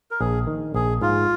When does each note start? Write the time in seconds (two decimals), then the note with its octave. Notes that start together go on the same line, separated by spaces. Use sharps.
0.11 A#4
0.20 A#1 G#4
0.47 D#3
0.74 A#1 G#4
1.02 G#2 F4